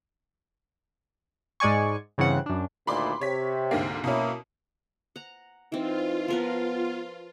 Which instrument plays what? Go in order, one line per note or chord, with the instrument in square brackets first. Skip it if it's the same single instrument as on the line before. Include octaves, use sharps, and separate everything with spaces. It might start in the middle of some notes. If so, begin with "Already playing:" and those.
[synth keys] G#2 G#3 D5 G#5 C#6
G2 C#3 E3 C4 F#5
F#2 D4
[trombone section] D2 A#2 D#3 [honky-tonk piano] B5 C6 D6
[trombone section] C3 [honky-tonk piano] C#5 B6
[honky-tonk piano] D2 G#2 A#3
[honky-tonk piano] B2 C#4 [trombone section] A#3 E4
[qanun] F#5 A#5
[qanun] E3 C4 [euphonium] D#4 [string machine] F4
[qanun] F3 A#4 B4 [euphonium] B3